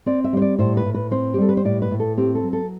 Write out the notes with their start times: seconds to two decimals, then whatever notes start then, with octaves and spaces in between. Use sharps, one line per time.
0.06 C4 D5
0.24 E5
0.33 G3 C5
0.42 D5
0.58 A2 C5
0.77 B4
0.85 A2
0.94 B4
1.11 C4 C5
1.34 G4
1.38 G3 A4
1.49 B4
1.57 C5
1.65 A2 D5
1.82 B4
1.91 A2
2.00 A4
2.17 C4 G4
2.35 A4
2.43 F#3
2.53 A4